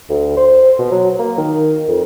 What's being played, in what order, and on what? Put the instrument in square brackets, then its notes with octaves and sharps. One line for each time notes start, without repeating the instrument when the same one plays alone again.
[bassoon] D2
C5
B2
F#3
A#3
D#3
F2